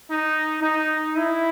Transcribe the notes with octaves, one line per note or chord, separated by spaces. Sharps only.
D#4
D#4
E4